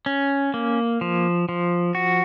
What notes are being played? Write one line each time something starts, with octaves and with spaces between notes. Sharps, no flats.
C#4
A#3
F3
F3
F#4